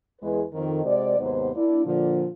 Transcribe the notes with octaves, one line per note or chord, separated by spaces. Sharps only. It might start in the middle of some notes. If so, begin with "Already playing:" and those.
E2 G#3 G#4 B4
F2 D#3
C3 G#3 F#4 C5 D5
D#2 G#2 C3 F#3 B3 C5
A#3 D4 E4
A#2 D3 F3